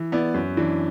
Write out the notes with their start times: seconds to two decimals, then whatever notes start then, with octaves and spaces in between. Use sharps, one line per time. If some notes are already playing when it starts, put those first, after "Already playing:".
Already playing: E3
0.12 B3 E4 D5
0.34 F#2
0.57 E3 D4